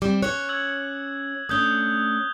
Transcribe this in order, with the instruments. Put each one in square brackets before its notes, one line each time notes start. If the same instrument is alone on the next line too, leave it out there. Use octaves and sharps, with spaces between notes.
[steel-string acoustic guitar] G3 C4 [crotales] D6
[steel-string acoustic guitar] C#4 C#5 [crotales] F#6
[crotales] E6 G#6 F#7
[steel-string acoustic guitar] A3 C#4 D4 [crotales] D#6 G6 G7